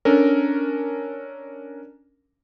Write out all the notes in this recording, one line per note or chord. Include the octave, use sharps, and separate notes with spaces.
C#4 D4 A4 A#4